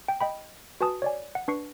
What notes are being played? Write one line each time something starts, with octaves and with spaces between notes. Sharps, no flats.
G5
D#5 G5 B5
F#4 B4 G#5 A5 D#6
C#5 D5 G#5
F#5
D4 B4 C#6 C7 C#7